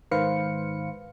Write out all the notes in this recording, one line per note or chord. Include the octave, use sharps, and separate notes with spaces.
G#2 D#3 B4 C5 F5 C#7